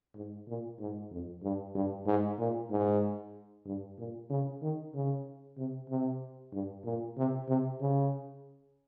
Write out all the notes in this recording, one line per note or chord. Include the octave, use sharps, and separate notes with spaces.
G#2
A#2
G#2
F2
G2
G2
G#2
A#2
G#2
G2
A#2
C#3
D#3
C#3
C3
C3
G2
A#2
C3
C3
C#3